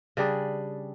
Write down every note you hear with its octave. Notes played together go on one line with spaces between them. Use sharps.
C#3 G3 D4 G#4